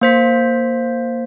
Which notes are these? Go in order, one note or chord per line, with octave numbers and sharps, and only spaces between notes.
A#3 C5 B6